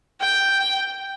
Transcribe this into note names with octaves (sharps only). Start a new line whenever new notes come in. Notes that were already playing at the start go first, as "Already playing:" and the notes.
G5